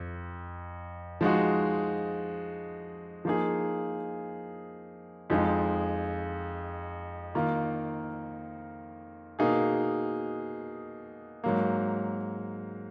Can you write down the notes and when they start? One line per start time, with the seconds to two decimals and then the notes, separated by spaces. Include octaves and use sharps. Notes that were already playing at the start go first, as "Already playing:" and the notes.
Already playing: F2 F3
1.21 F3 G#3 D#4 F#4
3.25 F3 A#3 D#4 G#4
5.30 F2 F3 G#3 D#4
7.35 D#3 A#3 F4
9.39 B2 A#3 D#4 G#4
11.44 G#2 F#3 A#3